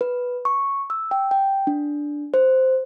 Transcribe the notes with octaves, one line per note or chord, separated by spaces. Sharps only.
B4
C#6
E6
G5
G5
D4
C5